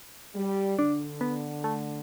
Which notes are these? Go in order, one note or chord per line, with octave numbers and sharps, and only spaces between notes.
G3
D3 D4
B3
A3